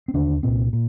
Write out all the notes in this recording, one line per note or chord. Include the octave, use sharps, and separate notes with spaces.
C4
D#2 D3 D4
C2 A#2 C4
A#2